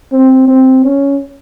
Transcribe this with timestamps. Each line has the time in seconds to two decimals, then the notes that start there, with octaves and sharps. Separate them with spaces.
0.12 C4
0.48 C4
0.84 C#4